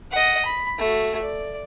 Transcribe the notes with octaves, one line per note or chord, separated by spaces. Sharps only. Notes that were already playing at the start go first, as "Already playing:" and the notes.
D#5 F#5
B5
A3 F#4
D5